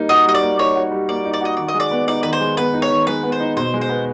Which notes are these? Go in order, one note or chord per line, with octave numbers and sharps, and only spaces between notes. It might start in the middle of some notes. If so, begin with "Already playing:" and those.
Already playing: G3 A#3 D#4
F#4 D#5
G3 D#5
D5
A#3
D#4 C#5
F#4
G3
A#3 D5
D#4
D5
F#4 D#5
D#3 D5
D#5
G#3
D5
B3
D#4 D5
D#3 B4
C5
G#3
B3 B4
D#4
C#5
D#3
G#3 B4
B3
C5
D#4
B2 C5
G#3
C5
B3